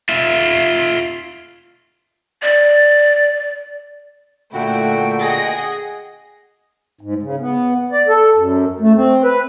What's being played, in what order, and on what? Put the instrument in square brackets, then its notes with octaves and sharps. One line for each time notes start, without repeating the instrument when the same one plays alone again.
[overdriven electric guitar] F4 E5
[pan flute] D5
[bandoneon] A#2 D3 F#4 [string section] A3 E4 [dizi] G5
[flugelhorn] G#4 [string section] D#5 F#5 A#6
[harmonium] G#2
C#3
B3
D5
A4
F#2
A3
C4
B4